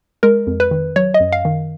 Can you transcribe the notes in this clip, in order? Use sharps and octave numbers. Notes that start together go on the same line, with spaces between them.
G#3 A#4
F2
B4
D#3
F#3 C#5
D#5
F#2
F5
D#3